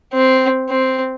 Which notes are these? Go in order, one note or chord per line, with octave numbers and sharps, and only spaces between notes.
C4
C4